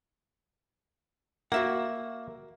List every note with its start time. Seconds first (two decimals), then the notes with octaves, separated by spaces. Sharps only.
1.52 A#3 F#4 E5 F#5